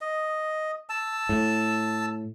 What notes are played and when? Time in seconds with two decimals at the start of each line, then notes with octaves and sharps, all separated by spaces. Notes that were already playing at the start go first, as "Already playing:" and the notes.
0.01 D#5
0.89 A5 E6
1.29 A2